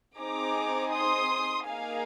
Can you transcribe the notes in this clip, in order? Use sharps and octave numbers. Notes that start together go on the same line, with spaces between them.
C4 D#4 G#4 A#5 D6
C6 D#6
A#3 D#4 G#4 F5 G#5